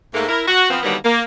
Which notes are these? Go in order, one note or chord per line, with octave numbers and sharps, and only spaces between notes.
G#2 A3 A#3
E4 A#4
F#4
F3 B3 C4
D3 D#3 F#3 G3 A#3 B3
A#3